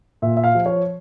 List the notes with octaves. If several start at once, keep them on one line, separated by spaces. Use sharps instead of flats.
A#2 E5
E5
F5
F3
C#5